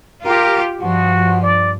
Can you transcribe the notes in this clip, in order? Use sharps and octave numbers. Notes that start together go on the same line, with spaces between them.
F4 G4 A#4
G2 F3 F#4
D5